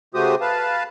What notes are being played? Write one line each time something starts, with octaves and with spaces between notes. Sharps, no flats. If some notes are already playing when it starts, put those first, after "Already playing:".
C#3 A3 F#4 G4 C5 D#6
B4 F5 A5